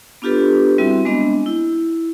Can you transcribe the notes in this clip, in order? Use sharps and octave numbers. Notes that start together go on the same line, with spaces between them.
B3 D4 F4 G4 A4 B4
G3 C4 E4 F#4 E5
G#3 B3 C4 D4 D#5
E4